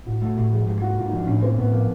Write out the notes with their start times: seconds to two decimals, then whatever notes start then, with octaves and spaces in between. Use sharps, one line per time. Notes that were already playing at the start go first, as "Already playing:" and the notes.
0.06 A2 F#4
0.22 A3 F#4
0.36 A2 G4
0.52 F3 G#4
0.67 G#2 G4
0.82 A#3 F#4
0.97 G#2 F4
1.07 D#4
1.12 F3 D4
1.27 A2 C#4
1.42 A#3 C4
1.57 A2 B3
1.72 F3 A#3